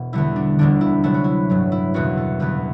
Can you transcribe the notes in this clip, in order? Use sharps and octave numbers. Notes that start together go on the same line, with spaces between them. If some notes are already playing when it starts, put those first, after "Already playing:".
Already playing: E1 B2
E2 D3 G3 E4
D4
E1 D2 D3 D4
E4
D2 C3 F#3 A3 E4
F#4
E4
A1 G2 F#3
E4
F#1 E2 B2 F#4
A4
F#1 E2 D3 G3 B4